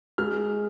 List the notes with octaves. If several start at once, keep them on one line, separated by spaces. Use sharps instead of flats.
G#3 F6